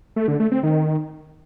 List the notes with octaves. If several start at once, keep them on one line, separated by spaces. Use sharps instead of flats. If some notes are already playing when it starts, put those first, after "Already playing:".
A3
D3
A3
C4
D#3